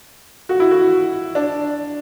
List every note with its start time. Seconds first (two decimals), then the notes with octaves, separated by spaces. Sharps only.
0.49 F#4
0.60 E4
0.71 F#4
1.35 D4